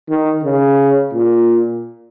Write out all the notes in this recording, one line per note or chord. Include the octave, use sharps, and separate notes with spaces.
D#3
C#3
A#2